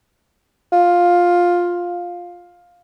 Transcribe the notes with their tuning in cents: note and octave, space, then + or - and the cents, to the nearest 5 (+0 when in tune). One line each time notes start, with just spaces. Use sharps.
F4 +10